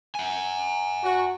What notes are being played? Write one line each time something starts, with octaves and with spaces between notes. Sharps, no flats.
F#5 G#5
F#4